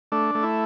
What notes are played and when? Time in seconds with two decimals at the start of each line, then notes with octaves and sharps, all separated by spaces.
0.12 A3 D4
0.35 A3
0.43 E4